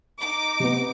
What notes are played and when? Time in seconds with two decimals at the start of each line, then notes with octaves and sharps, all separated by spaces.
0.19 D#4 D6
0.60 C3 B3